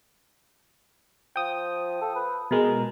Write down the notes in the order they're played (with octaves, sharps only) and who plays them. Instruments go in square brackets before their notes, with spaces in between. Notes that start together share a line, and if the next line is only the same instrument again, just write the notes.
[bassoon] F3 [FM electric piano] G5 D#6
[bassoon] A4
B4
[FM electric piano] B2 G#3 [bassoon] A#4